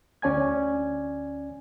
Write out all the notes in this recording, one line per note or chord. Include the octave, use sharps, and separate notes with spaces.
D2 C#4 D5 G#5 G#6